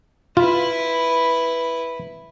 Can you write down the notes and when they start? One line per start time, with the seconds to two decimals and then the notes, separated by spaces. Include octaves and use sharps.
0.37 E4 F4 B4